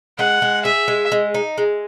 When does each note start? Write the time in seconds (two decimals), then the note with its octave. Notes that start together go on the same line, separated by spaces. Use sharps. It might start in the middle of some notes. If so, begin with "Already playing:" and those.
0.19 G#3 F#5
0.42 G#3
0.65 G#4 E5
0.88 G#3
1.12 G#3
1.34 D#4
1.58 G#3